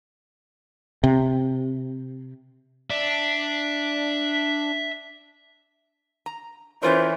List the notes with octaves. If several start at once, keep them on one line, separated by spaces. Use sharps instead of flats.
C3
D4 E5
A#5
E3 C#4 F4 A#4 C5 C#5 C6